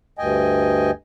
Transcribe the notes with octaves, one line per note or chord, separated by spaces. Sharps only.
D2 G2 D#5 G5 G#5